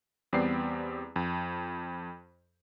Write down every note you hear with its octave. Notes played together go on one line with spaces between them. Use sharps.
E2 G3 B3 C4 D5 C7
F2